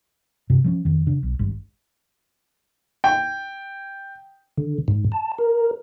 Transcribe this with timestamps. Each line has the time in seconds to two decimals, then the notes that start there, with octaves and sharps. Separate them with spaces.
0.50 G2 C3
0.64 F3 G3 C#4
0.85 F2 D#3
1.07 C#3 D4
1.23 B1
1.39 G#1 G2
3.04 G5
4.58 D3
4.88 G#2
5.12 A5
5.38 A#4